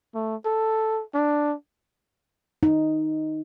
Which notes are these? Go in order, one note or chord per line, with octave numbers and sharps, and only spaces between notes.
A3
A4
D4
D#4